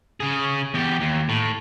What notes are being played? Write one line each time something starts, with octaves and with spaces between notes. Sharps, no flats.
C#3 G#4
E2 G4
D#2
A2